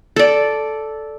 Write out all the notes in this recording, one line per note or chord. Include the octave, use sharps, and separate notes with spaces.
A4 D5